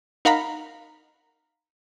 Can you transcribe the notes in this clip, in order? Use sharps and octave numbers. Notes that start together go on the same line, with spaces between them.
D#4 A#4 F5 F#5 A#5 B5